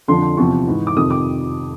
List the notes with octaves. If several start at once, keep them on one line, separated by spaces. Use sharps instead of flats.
F2 D3 F3 C6
C6
E2 C3 F3 C#6
G#2 E3
D6
F2 C3 D#3 D#6
D6